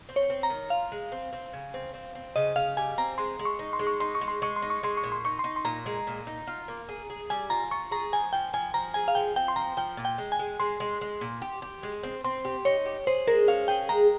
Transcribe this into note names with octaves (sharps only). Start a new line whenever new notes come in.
C4
C#5
C4
A#5
D#3
F4 F5
G#3
C4
C4
C#3
C4
C4
C4
C#3 D#5
C#3 F5
G3 G#5
C4 A#5
G#3 C6
G#3
C#6
D#4
C6
G#3
C#6
D#4 C6
C#6
G#3
C6
G#3 C#6
C6
D#4
C#6
G#3 C6
C#6
A#2
C6
D#4 C#6
D#4 C6
C6
A#2 A#5
G#3
A#2
D#4
F4
A#3
G#4
G#4
G3 G#5
F4 A#5
F4 C#6
G#4 A#5
F3 G#5
F3 G5
F3 G#5
F3 A#5
G#4 G#5
F5
F3 G5
C4 G5
C6
F3 A#5
F3 G5
A#2
G5
G#3
G#5
G#3
G#3 C6
G#3
G#3
A#2
G4
G4
G#3
C4
C4 C6
G4
D#4 C#5
G4
G#4 C5
G#3 A#4
C#4 F5
G#4 G5
G#3 A#5